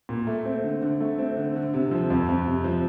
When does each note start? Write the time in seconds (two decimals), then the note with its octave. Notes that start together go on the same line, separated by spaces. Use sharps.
0.09 A#2
0.27 A3
0.45 C4
0.63 D3
0.82 D3
1.00 A3
1.19 C4
1.37 D3
1.56 D3
1.74 C3
1.91 F3
2.10 F2
2.29 F2
2.47 C3
2.64 F3